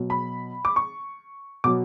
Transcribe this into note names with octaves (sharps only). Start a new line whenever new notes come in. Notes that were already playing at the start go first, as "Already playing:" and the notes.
Already playing: B2 F#3
B5
D6
C#6
B2 F#3 D6